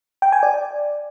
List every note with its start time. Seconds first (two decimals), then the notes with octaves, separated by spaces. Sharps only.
0.22 G5
0.32 G#5
0.43 D5